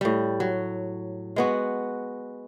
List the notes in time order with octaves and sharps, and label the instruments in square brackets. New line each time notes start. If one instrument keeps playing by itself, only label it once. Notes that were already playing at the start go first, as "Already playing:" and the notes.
[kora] A2 G3
F#3
G#3 B3 F#4